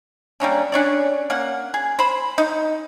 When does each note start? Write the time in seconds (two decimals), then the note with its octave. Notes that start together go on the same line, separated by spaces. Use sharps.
0.40 G3 A#3 C#4 D4
0.72 C#4 D4 C#5 D5
1.30 A#3 C#4 F#5
1.74 G#4
1.99 C5 B5
2.38 D#4